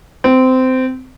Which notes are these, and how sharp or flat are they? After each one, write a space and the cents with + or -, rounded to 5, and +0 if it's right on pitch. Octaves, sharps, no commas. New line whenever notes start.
C4 -20